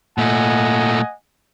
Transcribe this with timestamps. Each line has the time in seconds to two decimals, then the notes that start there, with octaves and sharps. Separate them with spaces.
0.18 A#2 A3 D#5 F#5 G#5